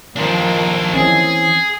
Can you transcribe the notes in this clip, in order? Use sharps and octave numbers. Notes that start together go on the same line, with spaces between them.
D#2 F3 A#3 D4 F4
E3 C4 C#4 G#4